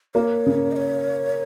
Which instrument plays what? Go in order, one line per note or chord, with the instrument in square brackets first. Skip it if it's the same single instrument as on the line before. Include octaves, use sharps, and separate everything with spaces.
[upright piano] A#3 [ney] C#5
[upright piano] C#3
[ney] D#5
C#5